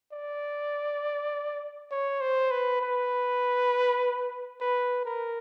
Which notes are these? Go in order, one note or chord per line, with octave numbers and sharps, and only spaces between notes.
D5
C#5
C5
B4
B4
B4
A#4